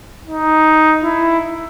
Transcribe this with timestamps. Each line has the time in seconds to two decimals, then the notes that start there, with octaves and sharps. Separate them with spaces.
0.27 D#4
1.03 E4